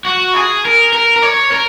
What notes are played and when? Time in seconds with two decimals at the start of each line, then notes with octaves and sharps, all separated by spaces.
0.06 F#4
0.35 G#4
0.65 A#4
0.93 A#4
1.16 A#4
1.23 C#5
1.51 A#4